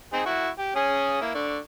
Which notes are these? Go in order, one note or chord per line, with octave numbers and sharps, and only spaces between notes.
C4 D#4 G#4
E4 F#4 C#6
G4
C#4 G#4 D#6
A#3 E4
D3 D5 C#6